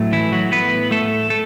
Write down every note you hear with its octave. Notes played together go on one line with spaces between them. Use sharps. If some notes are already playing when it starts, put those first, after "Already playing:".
Already playing: A2 F#3 A3
E3 E4
F#3 F#4
B3 B4
A3 A4
A3 A4